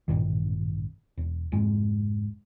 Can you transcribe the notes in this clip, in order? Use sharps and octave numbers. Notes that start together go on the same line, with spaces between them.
A1 G2 A#2 D#3
E1
F1 G#2